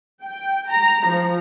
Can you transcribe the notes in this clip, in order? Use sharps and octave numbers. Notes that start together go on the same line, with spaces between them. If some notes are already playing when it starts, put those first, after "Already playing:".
G5
A#5
F3